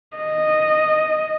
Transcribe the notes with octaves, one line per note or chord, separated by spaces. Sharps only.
D#5